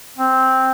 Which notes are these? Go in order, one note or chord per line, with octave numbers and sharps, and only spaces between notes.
C4